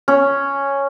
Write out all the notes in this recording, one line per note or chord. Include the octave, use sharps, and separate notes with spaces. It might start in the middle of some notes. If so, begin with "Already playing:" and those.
C#4